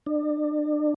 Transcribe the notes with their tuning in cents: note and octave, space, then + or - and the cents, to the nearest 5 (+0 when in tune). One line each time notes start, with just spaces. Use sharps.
D4 +35